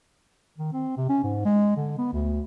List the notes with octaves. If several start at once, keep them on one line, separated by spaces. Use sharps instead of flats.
D#3
C4
C3
C#4
G#2
G#3
D3
B3
D2